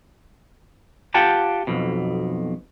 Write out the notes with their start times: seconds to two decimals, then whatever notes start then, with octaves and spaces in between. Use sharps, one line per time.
1.14 F4 G4 F#5 G5 A5
1.67 B1 F2 B2